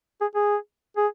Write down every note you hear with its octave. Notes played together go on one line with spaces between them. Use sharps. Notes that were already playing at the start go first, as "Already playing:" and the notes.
G#4
G#4
G#4